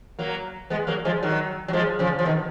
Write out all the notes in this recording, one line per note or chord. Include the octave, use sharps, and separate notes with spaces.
F#3 A#3
G#3 B3
F#3 A#3
F3 G#3
D#3 F#3
F#3
F3 G#3
C#3 F3
F3
B2 D#3